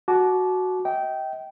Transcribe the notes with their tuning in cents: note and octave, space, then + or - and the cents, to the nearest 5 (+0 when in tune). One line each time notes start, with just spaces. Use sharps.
F#4 +0 A5 -30 D6 +0
D#5 +40 G5 -15